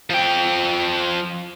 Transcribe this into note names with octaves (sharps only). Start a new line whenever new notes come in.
F3 G5